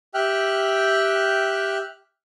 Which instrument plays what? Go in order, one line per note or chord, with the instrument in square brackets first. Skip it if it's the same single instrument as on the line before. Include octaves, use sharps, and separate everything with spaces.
[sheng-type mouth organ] G4 E5 G5 F6 F#6